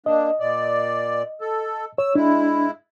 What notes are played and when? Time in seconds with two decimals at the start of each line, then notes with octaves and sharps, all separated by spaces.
0.06 A#3 D4 D#5
0.40 A#2 D5
1.41 A4
1.98 C#5 E6
2.15 G#3 D4 E4